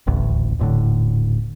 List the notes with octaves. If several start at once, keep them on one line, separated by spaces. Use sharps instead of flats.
D#1 A1 D2
D#1 A2 D3